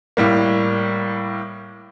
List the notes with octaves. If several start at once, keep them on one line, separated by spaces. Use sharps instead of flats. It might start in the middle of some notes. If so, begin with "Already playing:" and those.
A2 G3 A#3